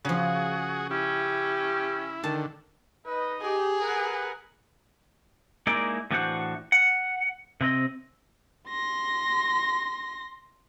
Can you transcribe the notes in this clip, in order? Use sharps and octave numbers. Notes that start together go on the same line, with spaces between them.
C#3 F3 F#4 G#4
C#4 E4 G4
D3 D#3 A5
D#4 B4 D#5
G4 G#4
A#4 B4 F#5
G#3 A#3 D#4 E4 D5
A2 E3 D4 F#4 C5 F#5
F#5
C3 C4 D#5
C6 A#6